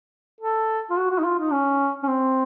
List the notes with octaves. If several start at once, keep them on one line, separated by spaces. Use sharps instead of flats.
A4
F4
F#4
F#4
D#4
F4
D#4
C#4
C#4
C4